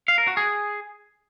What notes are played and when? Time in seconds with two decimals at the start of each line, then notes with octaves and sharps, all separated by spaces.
0.08 F5
0.18 A#4
0.27 F#4
0.37 G#4